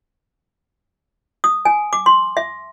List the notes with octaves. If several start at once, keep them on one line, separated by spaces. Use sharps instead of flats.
D#6
G#5
D6
C6
E5